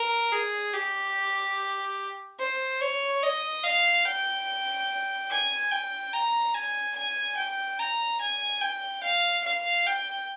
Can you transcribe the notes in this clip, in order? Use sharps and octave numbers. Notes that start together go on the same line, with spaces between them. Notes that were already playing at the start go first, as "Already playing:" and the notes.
Already playing: A#4
G#4
G4
C5
C#5
D#5
F5
G5
G#5
G5
A#5
G#5
G#5
G5
A#5
G#5
G5
F5
F5
G5